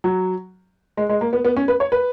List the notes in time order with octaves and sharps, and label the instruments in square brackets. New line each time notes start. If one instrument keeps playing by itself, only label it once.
[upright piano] F#3
G#3
G#3
A#3
B3
B3
C#4
B4
C#5
B4